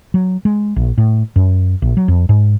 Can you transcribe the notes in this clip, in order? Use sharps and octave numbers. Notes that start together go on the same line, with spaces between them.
F#3
G#3
A#1
A2
F#2
A#1
F#3
F2
G#2